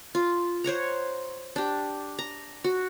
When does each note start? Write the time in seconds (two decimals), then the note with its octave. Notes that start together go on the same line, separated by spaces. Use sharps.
0.15 F4
0.64 C5 C#5 F#5 A#5
1.56 D4 G4
2.19 A#5
2.64 F#4